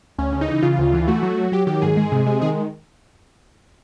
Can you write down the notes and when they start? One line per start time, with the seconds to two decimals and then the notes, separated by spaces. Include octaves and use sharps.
0.18 D2 C#4
0.33 C#3
0.41 D#4
0.48 E3
0.63 C#3 F4
0.79 D2
0.93 E3
1.08 A3 F#4
1.23 F#3
1.38 F#3
1.52 F#3 G4
1.67 D#3 G4
1.82 G#2 G#4
1.97 G#3
2.12 C3
2.27 G#3
2.42 D#3 G#4